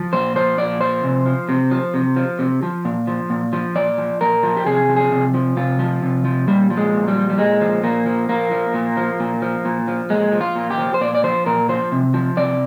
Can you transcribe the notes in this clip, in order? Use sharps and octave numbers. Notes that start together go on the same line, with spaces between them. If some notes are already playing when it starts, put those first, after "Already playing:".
Already playing: F3
A#2 C5
F3 C5
A#2 D5
F3 C5
C3
F3
C3
F3
C3
F3
C3
F3
A#2
F3
A#2
F3
A#2 D5
F3
A#2 A#4
F3
G4
C3 G#4
F3
G#4
C3
F3
C3 F4
F3
C3
F3
A#2 G3
F3
G#3
A#2
G3
F3
G3
A#2 G#3
F3
A#2 A#3
F3
A#2 A#3
F3
A#2
F3
A#2
F3
A#2
F3
A#2 G#3
F3
F4
A#2
G4
F3
C5
A#2 D5
D5
F3 C5
A#2 A#4
F3 C5
C3
F3
C3 D5